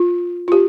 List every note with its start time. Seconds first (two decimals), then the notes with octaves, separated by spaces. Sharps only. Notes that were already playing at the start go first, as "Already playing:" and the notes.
Already playing: F4
0.48 F4
0.52 G4